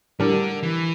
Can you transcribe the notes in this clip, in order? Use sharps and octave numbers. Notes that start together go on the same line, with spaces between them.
A2 D3 G3 D4 G4 A#4
E3